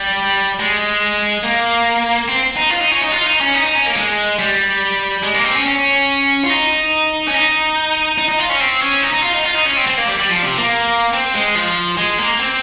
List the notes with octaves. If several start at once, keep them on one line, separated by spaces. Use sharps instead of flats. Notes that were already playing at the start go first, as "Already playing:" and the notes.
Already playing: G3
G#3
A#3
C4
D#4
F4
D#4
C#4
D#4
F4
D#4
C#4
D#4
D#4
C#4
A#3
G#3
G3
G#3
A#3
C4
C#4
C#4
F4
D#4
C#4
D#4
D#4
D#4
F4
C#4
C4
C#4
D#4
D#4
F4
D#4
F4
D#4
C#4
C4
C4
A#3
G3
G3
F3
C3
A#3
C4
G#3
F3
G#3
A#3
C4